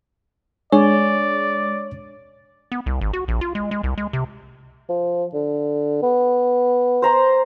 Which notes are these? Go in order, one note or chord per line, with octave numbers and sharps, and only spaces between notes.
G#3 D4 C#5 D5
B3
C2
G#1
F#4
A#1
F4
G#3
G#3
C2
G#3
C3
F3
D3
B3
C5 A#5 C6